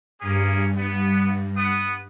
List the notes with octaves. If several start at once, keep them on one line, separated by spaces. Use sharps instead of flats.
G2 A#3 C#4 G#4
B3
B3 F#5 D#6